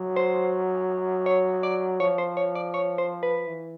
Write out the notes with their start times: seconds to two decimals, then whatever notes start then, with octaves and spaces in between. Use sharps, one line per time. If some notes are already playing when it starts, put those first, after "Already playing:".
Already playing: F#3
0.16 C5
1.26 C#5
1.63 D5
2.00 F3 C#5
2.18 C5
2.37 C#5
2.55 D5
2.74 C#5
2.98 C5
3.23 B4
3.47 E3